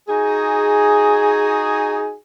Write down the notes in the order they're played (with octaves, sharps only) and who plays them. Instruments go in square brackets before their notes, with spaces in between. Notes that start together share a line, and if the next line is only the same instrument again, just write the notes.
[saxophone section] D#4 F#4 G#4